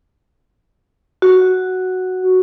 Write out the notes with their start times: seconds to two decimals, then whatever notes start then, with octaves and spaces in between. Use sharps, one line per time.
1.22 F#4